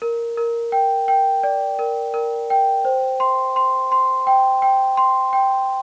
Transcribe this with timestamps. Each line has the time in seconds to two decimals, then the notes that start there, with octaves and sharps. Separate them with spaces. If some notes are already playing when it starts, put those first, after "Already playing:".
0.02 A#4
0.37 A#4
0.72 G5
1.08 G5
1.43 D5
1.79 A#4
2.14 A#4
2.50 G5
2.85 C5
3.20 C6
3.56 C6
3.92 C6
4.27 G5
4.62 G5
4.97 C6
5.33 G5